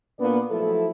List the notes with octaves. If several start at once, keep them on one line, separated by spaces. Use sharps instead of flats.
A#2 A#3 B3 D4 B4 D5
F3 F#3 A3 E4 A4